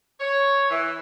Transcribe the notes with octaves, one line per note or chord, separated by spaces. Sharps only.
C#5
E3